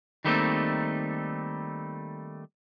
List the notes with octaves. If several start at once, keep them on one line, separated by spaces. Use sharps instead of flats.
D#3 G3 A3 A#3 C4 D#4